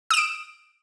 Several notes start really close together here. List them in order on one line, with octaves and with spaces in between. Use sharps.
D#6 E7 D7